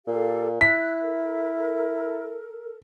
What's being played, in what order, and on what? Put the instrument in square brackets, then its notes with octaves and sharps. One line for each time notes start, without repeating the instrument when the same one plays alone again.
[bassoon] A#2 [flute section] G4 A4 F5
[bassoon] E4 [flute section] F#6 [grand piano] B6
[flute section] A4 A#4